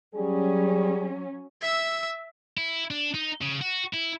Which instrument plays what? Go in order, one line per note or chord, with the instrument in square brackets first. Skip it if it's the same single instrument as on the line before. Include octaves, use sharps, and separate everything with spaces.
[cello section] F#3 C#4 [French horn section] G3 G#4
[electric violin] E5 E6
[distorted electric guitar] E4
D4
D#4
C#3
F#4
E4